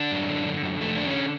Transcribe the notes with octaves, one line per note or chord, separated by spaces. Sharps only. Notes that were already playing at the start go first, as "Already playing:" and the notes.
Already playing: D3 D4
F#2
D3
D3
F#2
F2 A3
D3 D4
C#4